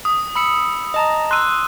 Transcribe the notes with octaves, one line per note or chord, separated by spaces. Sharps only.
D#6
B5 E6 C#7
D#5 A5 A#5
C6 E6 F#6 D#7